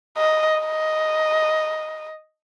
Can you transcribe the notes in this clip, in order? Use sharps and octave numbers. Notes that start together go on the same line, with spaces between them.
D#5
D#5